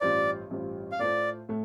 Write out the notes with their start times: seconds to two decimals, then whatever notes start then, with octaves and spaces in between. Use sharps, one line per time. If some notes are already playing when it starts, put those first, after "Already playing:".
0.01 A1 G2 G3 F4 C5 D5
0.50 A1 G2 G3 F4 C5
0.92 F5
0.99 A2 A3 F4 C5 D5
1.49 A2 A3